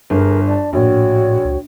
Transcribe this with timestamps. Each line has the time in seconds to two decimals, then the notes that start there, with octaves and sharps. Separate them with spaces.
0.10 G1 G#4 A#4
0.46 D5 A5
0.73 A#1 A2 F#4 C#5 G5
1.45 C#2